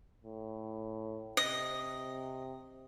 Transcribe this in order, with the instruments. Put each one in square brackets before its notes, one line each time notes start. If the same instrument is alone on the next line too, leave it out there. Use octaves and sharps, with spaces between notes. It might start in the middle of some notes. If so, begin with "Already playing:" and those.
[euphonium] A2
[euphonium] C3 [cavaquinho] D#5